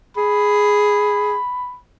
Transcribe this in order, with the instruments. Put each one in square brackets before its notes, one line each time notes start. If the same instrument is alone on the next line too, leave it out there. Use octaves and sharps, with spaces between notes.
[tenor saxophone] G#4 [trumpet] B5